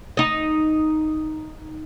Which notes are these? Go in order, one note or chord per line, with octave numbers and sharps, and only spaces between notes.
D#4 D#5